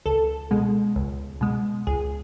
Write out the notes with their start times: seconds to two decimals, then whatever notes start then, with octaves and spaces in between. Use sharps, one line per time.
0.06 C#2 A4
0.51 B2 G#3
0.96 C#2
1.41 B2 G#3
1.87 C#2 G#4